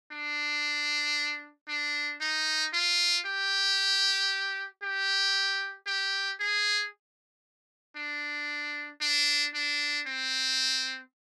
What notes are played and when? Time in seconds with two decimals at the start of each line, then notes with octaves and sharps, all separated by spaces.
0.12 D4
1.68 D4
2.21 D#4
2.73 F4
3.26 G4
4.83 G4
5.87 G4
6.40 G#4
7.96 D4
9.01 D4
9.54 D4
10.06 C4